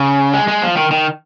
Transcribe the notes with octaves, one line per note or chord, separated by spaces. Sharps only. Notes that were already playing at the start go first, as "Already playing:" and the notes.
Already playing: C#3
G#3
G#3
F3
D#3
D#3